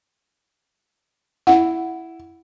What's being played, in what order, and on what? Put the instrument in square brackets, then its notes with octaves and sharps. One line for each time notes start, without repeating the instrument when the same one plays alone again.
[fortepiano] E4 [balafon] F#5